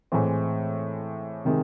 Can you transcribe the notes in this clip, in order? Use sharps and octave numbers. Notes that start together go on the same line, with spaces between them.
A2 E3 G#3 C4
C3 D#3 G#3